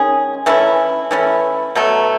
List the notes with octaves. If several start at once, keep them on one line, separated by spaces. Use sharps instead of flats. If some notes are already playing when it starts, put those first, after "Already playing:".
Already playing: D#3 G#3 C#4 G#4
E3 A3 C#4 E4
E3 A3 C#4 E4
B2 F#3 A3